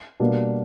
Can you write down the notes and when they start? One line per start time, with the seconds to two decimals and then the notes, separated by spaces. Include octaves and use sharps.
0.20 B2 G3 A#3 D4